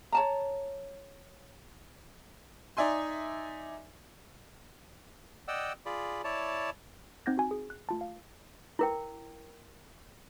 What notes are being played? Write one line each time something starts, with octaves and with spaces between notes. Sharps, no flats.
C#5 A5 A#5
D#4 D5 E5 G#5 C6
D5 D#5 F#5 G5 E6
F4 G#4 D5 B5
E4 C#5 D5 A5
C4 D#4 F#5 G6 G#6 A#6
F#4 G#5
G#4
F#6
A3 F4 A5
F5
E4 A#4 G5